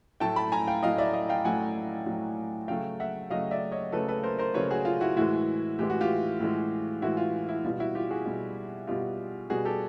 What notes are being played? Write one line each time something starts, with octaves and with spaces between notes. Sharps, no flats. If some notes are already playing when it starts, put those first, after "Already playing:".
A2 F#3 A3 G5 A5
A5 B5
G#5 A#5
F5 G5
A2 F#3 A3 D#5 F5
D5 E5
D#5 F5
F5 G5
A2 F#3 A3 F#5 G#5
A2 F#3 A3
C#3 F#3 A3 F5 G5
E5 F#5
C#3 F#3 A3 D#5 F5
D5 E5
C#5 D#5
C#3 F#3 A3 A4 B4
A4 B4
A#4 C5
A#4 C5
C#3 F#3 A3 B4 C#5
F#4 G#4
F4
E4 F#4
A2 E3 G#3 E4 F#4
A2 E3 G#3 G4
F#4
F4 G4
A2 E3 G#3
A2 E3 G#3 E4 F#4
F4
E4
B2 G3 F4
E4 F#4
F4 G4
F#4 G#4
B2 G3
B2 G3 F4 G4
B2 G3 F#4 G#4
G4 A4